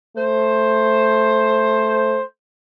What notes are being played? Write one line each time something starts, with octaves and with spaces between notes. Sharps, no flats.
A3 C5